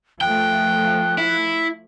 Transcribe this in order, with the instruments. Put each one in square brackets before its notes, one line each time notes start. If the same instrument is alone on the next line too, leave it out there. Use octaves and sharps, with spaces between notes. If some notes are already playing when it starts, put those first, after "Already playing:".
[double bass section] F3 A3 [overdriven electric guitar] G5 [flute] F#6
[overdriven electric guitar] E4